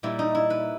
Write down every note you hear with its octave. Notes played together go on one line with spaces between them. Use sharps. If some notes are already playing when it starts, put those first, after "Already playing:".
A#2 G3 E4
D#4
E4
B4